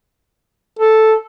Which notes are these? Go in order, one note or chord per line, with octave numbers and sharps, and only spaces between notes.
A4